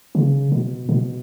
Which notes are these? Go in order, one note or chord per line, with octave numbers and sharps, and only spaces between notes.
C#3
B2
B2